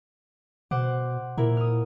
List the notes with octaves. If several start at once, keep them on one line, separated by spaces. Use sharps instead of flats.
B2 C5 F#5 D6
A#2 A#3 E4 A#4
D#6 F6